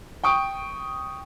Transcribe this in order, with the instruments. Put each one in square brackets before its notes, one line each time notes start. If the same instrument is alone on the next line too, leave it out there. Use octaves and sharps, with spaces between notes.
[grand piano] G5 C#6 D#6 D7